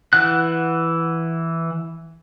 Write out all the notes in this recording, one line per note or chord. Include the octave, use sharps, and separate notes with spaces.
E3 F#5 F#6